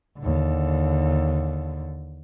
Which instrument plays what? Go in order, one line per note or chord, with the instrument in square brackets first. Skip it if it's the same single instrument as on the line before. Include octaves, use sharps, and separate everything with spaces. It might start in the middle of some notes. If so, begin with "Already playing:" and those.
[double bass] D#2 D3